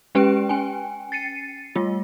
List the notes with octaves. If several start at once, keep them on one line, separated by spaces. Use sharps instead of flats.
G#3 C#4 G4 B4 G5 D7
C#4 G5 G#5
A6 C7 C#7 D#7
G3 A3 F4